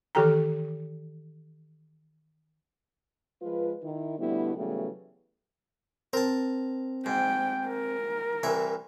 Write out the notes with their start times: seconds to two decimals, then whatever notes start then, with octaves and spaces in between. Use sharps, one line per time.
0.15 D#3 E3 G4 A4 G5 A#5
3.42 F3 G#3 F4 B4
3.82 D#3 E4
4.18 B2 D3 G3 A3 B3 E4
4.55 C#3 E3 F#3 G3 A3 B3
6.13 C4 A#4 A5
7.06 G#2 G5
7.67 A#4
8.43 C2 E3 E5